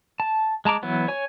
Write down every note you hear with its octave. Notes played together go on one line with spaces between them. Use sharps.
A5
G#3 A5 A#5 D6
E3 F#3 B3
C#5 G#5